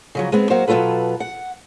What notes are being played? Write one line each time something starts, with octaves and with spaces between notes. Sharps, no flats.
C#3 F3 F#3
G#3 B3 C4
F#3 A#3 F#4 C5
B2 F#3 D#4 F4 A4 B4
F#5